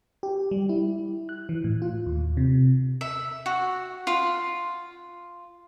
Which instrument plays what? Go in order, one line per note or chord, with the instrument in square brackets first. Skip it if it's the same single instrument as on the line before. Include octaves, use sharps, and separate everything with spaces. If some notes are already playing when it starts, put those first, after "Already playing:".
[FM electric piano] G4
G3
E4
F#6
E3
A2
F4
D#2
C3
[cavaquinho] E5
F#4
F4